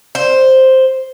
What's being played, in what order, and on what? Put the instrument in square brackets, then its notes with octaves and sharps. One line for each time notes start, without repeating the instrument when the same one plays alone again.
[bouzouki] C5